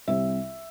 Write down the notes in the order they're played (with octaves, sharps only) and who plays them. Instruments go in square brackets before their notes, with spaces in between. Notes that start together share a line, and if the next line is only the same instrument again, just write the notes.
[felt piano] C2 C3 G3 C4 E5